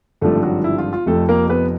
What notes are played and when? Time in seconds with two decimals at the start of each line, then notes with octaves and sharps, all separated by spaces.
0.21 G#1 G2 D3 F3 A3 A4
0.43 F#3 F#4
0.64 E4
0.78 F4
0.93 F4
1.06 F1 F2 C3 F3 A3 A4
1.29 A#3 A#4
1.49 B3 B4